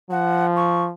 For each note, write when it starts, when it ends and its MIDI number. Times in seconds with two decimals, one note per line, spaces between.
0.11 0.92 53
0.11 0.47 78
0.56 0.84 85